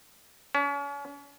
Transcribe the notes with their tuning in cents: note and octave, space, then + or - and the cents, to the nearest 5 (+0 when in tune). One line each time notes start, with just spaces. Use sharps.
C#4 +40